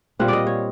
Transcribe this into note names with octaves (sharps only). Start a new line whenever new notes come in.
A#2 G3 C4 F4 F#5
D5 D#5
C#5